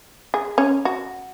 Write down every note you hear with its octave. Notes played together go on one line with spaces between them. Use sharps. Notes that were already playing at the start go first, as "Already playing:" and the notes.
G#4
C#4
F#4